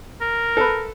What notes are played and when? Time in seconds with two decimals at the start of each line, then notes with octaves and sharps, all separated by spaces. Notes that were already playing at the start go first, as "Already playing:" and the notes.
0.21 A#4
0.57 A4 B4